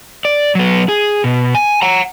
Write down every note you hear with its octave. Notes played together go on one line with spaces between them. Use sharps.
D5
F#3 B3
G#4
B2
G#5
F#5 A#5